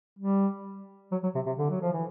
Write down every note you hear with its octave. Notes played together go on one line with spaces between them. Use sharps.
G3
F#3
F#3
C3
C3
D3
F#3
F3
E3